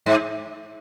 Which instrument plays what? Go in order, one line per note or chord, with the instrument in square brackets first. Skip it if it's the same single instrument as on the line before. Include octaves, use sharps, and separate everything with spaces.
[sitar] G#2